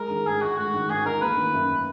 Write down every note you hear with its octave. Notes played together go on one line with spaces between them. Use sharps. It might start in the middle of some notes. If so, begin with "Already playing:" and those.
Already playing: G#3 A#4
D#3
G#2 G#4
D#4 F#4
G#3 F#4
D#3
G#2 G#4
D#4 A#4
A#3 B4
D#3
F#2